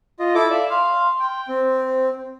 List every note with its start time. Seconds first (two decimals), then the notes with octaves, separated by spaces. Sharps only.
0.19 F4 D#5
0.35 E4 A4 D6
0.50 D5 E5 F5
0.70 F5 C6
1.20 G5
1.48 C4 C5